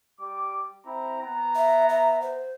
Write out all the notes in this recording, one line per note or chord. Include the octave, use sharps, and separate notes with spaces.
G3 D6
C4 E4 A#5
B3 A#5
E5
E5
C5